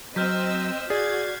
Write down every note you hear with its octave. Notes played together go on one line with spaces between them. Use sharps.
F#3 C4 D#5 E6 F6 G6 B6
F#4 G#4 D5 G#6 A6 C7